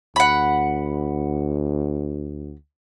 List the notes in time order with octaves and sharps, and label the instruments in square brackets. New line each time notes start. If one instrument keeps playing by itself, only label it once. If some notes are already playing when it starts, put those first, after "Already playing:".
[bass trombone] D2 [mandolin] F#5 B5